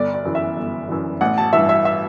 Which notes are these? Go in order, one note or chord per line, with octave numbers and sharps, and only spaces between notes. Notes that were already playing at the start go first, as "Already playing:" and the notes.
Already playing: G1 D5
D5
F#2 E3
E5
G1
F#2 E3
A1 F#5
A5
G2 E3 E5
E5
E5